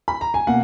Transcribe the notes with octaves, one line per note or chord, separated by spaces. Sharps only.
B5
A#5
G#5
B2 A#3 F#5